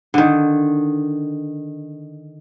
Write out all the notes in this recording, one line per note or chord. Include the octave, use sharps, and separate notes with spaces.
D3 D#3